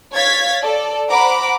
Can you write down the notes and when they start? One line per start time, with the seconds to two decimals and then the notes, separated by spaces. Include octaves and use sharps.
0.15 C#5 F5 G#6 A6 B6
0.62 A4 D5
1.08 C5 F#5 A#5 B5 D6